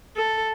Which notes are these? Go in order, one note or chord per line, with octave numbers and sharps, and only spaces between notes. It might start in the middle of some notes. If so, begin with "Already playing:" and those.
A4